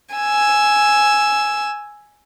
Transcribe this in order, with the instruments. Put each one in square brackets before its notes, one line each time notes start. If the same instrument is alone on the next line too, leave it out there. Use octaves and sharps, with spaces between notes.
[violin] G#5 E6